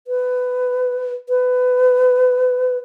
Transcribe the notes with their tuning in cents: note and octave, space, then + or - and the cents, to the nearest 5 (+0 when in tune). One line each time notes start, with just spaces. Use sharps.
B4 +20
B4 +25